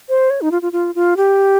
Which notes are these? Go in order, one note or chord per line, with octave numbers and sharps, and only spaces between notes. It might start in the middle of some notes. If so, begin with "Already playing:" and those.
C5
C#5
D#4
F4
F4
F4
F4
G4